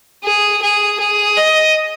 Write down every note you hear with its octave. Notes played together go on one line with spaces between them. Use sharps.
G#4
G#4
G#4
D#5